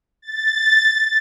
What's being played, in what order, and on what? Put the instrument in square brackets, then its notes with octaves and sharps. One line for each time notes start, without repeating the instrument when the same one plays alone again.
[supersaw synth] A6